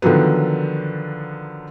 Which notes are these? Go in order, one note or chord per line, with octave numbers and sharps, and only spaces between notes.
D3 D#3 F3 F#3 B3